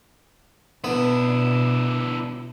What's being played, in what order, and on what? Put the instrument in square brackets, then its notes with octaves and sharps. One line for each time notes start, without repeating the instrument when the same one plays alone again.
[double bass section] B2 [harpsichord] B3 [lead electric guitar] D4 E4